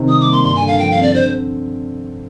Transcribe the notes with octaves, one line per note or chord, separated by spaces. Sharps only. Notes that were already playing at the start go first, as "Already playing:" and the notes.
Already playing: C3 D#3
G3 D#6
D6
A#3
C6
G2 C6
G#5
D3
F5
F3 G5
F5
C4
D5
D3 C5